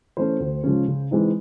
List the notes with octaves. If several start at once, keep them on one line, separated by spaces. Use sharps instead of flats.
E3 A3 C#4 C5
D2
C#3 F3 G#3 C#4
C#3
E3 G#3 C4 D#4